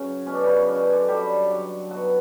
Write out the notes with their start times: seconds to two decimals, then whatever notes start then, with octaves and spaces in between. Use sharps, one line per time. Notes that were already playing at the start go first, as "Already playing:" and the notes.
Already playing: C#3 F#3 C#4
0.26 B2 C#4
0.35 D4
0.43 C#3 C#4
0.68 B2 D4
0.81 C#4
0.93 D3 D4
1.08 F#3 G3 G4
1.51 F#3
1.91 B2 F#3 F#4